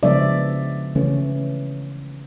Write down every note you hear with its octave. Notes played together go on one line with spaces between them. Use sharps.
C#3 F3 G#3 B3 D4 D5 E5
C#3 E3 A3 C#4